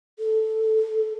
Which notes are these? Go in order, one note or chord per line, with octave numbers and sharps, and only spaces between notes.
A4